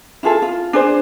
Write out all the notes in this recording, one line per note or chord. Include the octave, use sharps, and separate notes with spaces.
E4 F4 G#4 A4
F4
D4 G#4 C5